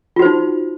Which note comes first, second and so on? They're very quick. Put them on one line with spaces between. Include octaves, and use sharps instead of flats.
F4 F#4 C5 D#4